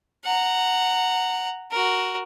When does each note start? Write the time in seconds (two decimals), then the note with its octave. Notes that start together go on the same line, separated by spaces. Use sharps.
0.24 F#5 A#5
1.71 F#4 A#4